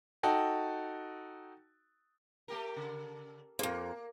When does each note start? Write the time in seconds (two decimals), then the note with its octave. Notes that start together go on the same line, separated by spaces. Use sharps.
0.23 D#4 F#4 A4 G5
2.48 A3 G4 A#4
2.77 C#3
3.59 F2 G#2 A#3